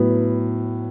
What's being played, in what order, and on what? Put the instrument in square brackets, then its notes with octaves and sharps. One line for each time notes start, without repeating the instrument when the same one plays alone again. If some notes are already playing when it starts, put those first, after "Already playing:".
Already playing: [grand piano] A2 F#3 B3